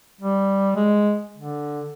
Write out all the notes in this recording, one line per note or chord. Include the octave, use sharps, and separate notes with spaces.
G3
G#3
D3